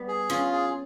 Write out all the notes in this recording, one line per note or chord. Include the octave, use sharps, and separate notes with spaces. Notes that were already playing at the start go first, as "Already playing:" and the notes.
Already playing: G3 B3
G#4
C#4 F4
G#4